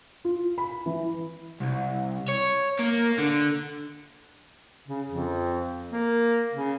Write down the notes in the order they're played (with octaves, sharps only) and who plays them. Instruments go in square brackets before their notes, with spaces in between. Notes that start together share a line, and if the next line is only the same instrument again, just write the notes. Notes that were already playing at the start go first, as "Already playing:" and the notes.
[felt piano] F4
B5
E3
[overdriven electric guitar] C2
C#5
A#3
D3
[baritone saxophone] C#3
F2
A#3
C#3